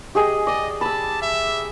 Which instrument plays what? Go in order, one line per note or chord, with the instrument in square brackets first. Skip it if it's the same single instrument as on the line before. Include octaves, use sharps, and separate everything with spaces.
[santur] G4 G#4 D#5
[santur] D5 [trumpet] D#5
[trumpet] A5 [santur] B5 E6
[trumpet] E5